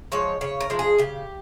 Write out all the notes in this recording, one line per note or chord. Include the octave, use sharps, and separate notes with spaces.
F3 G#3 C#5
C#3 C#5
A#4
F3 G#3
G#4
C#3 G4